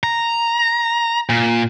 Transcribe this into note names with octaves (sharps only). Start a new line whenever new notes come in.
A#5
A#2